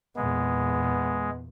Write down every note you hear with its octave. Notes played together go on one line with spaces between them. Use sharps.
E2 A#2 G#3 B3